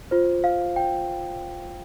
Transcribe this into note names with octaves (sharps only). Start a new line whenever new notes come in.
F4 C5
F5
G5